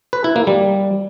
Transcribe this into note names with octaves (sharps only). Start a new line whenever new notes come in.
B4
E4
A#3
G3